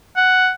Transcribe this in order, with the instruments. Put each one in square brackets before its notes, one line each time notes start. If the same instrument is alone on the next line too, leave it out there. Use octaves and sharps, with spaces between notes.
[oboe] F#5